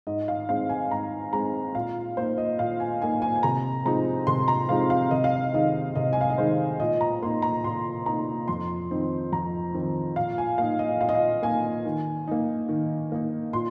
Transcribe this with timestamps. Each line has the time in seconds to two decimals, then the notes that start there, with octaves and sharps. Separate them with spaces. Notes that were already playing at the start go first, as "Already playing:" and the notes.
0.07 G#2 D#5
0.28 F5
0.49 G#3 C4 D#4 F5
0.69 G#5
0.90 G#2 A#5
1.32 G#3 C4 D#4 A#5
1.75 A#2 F5
2.17 A#3 D#4 C5
2.38 D#5
2.59 A#2 F5
2.80 G#5
3.01 A#3 D#4 G#5
3.22 G#5
3.36 G#5
3.43 C3 A#5
3.85 F3 G#3 C4 D#4 A#5
4.27 C3 C6
4.48 A#5
4.69 F3 G#3 C4 D#4 F5
4.90 F5
5.11 C3 D#5
5.24 F5
5.36 D#5
5.53 D#3 G#3 D#4 D#5
5.95 C3 D#5
6.13 G#5
6.21 F5
6.30 D#5
6.38 D#3 G#3 D#4 C5
6.80 A#2 D#5
7.01 A#5
7.22 A#3 D#4 C6
7.42 A#5
7.64 A#2 C6
8.06 A#3 D#4 A#5
8.48 F2 C6
8.91 D#3 C4 D#4
9.32 F2 A#5
9.74 D#3 C4 D#4
10.16 A#2 F5
10.38 G#5
10.58 A#3 D#4 F5
10.79 D#5
11.00 A#2 F5
11.09 D#5
11.15 F5
11.42 A#3 D#4 G#5
11.85 D#3
12.28 A#3 D#4
12.69 D#3
13.12 A#3 D#4
13.53 A#2 C6